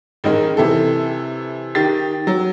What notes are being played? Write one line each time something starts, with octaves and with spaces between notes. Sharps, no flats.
A1 D#3 G#3 A#4
C3 E3 A4
D#3 G4 A6
F#3